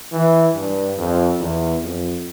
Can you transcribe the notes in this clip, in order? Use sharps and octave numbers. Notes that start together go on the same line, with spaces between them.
E3
G2
F2
E2
F2